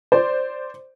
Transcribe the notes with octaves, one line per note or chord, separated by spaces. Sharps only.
C5 D5